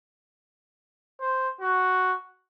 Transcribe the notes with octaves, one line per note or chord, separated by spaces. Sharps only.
C5
F#4